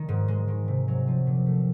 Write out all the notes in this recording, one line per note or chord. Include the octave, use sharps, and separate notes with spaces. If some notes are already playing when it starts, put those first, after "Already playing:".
Already playing: D#3
G#2
G#3
D#3
C3
F#3
F3
A#2
A3